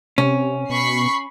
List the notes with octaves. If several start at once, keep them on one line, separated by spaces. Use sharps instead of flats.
C3 C#4
B2 B5 C#6 C7